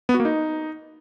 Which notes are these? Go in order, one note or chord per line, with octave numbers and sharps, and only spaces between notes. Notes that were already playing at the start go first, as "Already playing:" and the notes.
B3
F#4
A#3
D#4